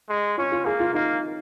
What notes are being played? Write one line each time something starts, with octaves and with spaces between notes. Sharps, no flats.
G#3
C#4 F4
F4
A#3 G#4
F4
A#3 D#4